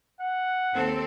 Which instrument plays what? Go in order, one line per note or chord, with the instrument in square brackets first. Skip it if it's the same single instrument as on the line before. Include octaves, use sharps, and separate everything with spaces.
[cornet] F#5
[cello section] D#2 C4 A4